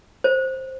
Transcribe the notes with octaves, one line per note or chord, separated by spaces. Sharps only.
C5